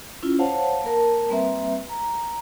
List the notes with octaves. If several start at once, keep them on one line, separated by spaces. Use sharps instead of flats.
C#4 E4 F4
C5 C#5 F5 F#5 A5
A#3 A#4 A5
G3 A#3 C4 B4 E5
A#5